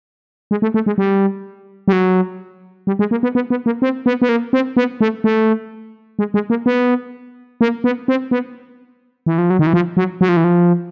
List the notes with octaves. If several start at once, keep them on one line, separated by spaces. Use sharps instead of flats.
G#3
A3
A3
G#3
G3
G3
F#3
G3
G#3
A#3
B3
B3
B3
A#3
C4
B3
B3
A#3
C4
B3
A3
A3
G#3
G#3
A#3
B3
A#3
B3
C4
B3
E3
F3
F#3
D#3
E3
F3
F#3
F#3
F3
E3
F3